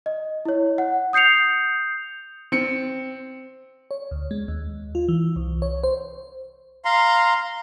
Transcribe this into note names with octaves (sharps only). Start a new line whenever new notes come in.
D#5
E4 C#5
F#5
D#6 G6 C7 C#7 F7
C4 C#7
C#5
D2
G#3
D#2
F4
E3
C2
C#5
C5
F5 A#5 C6